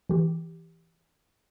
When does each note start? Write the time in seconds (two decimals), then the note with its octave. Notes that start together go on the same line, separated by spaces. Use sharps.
0.09 E3 G4